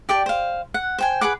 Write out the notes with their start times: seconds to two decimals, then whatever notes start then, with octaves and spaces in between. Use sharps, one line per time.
0.09 G4 D5 G5 A5
0.26 C5 F5
0.74 F#5
0.99 C5 G5 G#5
1.21 G#4 B4 F#5 D6